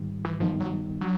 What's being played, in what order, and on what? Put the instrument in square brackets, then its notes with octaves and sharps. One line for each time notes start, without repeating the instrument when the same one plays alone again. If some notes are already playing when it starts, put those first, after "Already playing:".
Already playing: [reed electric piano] G#2 D#3 G3
[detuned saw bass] E3
[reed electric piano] G2 D#3 G3 B3 D#4 [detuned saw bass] F3
[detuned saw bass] F#3
[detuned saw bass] F#3 [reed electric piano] D4